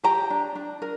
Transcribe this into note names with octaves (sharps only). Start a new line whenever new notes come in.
G4 G5 A#5
D4
D4
A#4